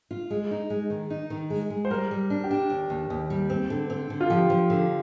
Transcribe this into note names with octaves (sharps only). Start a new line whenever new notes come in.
F4
G#3
D#4
G#3
D#3
D#4
D#3
G#3
G#3
C5
G3 A#4
G3
D4
G4
D4
D#2
D#2
D#2
G3
C4
D3
C4
D3
F4
F3 G4
F3
D3